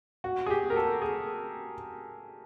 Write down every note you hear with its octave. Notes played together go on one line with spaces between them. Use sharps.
F#4
G#4
G4
A#4
A4
G#4